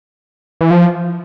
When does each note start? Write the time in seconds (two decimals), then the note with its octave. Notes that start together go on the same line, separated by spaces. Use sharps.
0.61 E3
0.70 F3